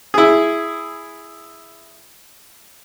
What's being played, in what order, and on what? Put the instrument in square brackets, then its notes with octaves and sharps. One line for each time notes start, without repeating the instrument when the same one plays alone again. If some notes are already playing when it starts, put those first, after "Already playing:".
[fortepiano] E4 G#4